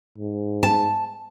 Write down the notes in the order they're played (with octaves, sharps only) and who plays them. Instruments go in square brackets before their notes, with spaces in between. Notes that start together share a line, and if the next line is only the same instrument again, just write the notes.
[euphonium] G#2
[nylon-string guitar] A5